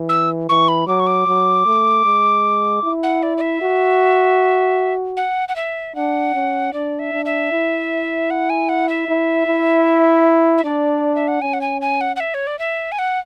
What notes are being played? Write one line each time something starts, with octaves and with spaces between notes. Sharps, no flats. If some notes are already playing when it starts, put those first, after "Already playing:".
Already playing: E3
E6
E3 C#6
B5
F#3 D6
C#6
D6
F#3
A3
G#3
E4
F#5
D5
D5
E5
F#4
F#5
F#5
E5
D4 F#5
C#4
D4 D5
E5
D4
E5
E4
F#5
G#5
F#5
E5
E4
E4
E5
D4 D5
E5
F#5
C#4 G#5
F#5
G#5
G#5
F#5
F#5
E5
C#5
D5
E5
G#5
F#5